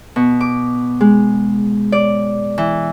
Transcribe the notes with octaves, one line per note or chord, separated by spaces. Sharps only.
B2
D6
G#3
D5
E3